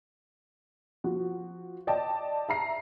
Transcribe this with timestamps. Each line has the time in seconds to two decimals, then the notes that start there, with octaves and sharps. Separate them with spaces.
1.04 F3 F#4
1.87 D5 D#5 G5 A5
2.49 E5 A#5 C7